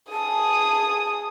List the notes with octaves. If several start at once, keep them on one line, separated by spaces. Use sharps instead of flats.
G#4 A5 D#6